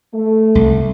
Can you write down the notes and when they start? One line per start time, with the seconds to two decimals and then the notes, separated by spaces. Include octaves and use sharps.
0.14 A3
0.55 C2